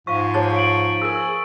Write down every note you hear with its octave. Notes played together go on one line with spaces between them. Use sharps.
G#2 F3 E5 F5 C#6 B6
G#4 C#5 A5 A6
D7 F#7
E4 G#4 A#4 E6